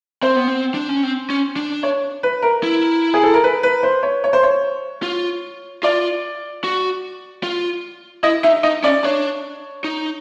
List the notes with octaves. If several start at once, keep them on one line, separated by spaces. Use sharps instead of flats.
C4 C5
B3
C4
D4
C#4
C4
C#4
D4
C#5
B4
A#4
E4
G#4
A4
A#4
B4
B4
C5
C#5
C#5
C5
C#5
F4
F4 D5
F#4
F4
E4 D#5
D#4 E5
D#4 D#5
C#4 D5
D4 C#5
D#4